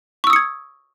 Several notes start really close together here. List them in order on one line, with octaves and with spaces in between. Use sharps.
C#6 E6 D#6 C#7 G#6